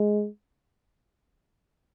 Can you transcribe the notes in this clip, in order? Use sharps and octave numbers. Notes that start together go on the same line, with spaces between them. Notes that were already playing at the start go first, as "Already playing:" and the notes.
Already playing: G#3